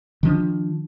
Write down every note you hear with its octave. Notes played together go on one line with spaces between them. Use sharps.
D#3 F3 D4